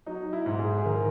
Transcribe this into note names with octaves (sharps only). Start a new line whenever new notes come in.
F#3 D#4
E4
G#2
G#4
G#4
D#3 A#4